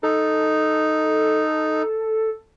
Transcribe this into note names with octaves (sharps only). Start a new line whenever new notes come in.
D#4 A4